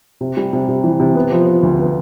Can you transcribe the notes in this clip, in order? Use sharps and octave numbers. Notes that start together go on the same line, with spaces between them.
C3
G3
C3
C3
E3
C3
B3
F3
F3
D2
B3